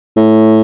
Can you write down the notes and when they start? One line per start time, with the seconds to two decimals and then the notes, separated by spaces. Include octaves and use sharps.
0.17 A2